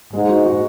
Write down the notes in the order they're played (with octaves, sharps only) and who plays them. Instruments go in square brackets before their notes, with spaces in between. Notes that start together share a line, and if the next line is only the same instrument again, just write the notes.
[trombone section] G#2 [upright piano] G#3
[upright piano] F#4
F#4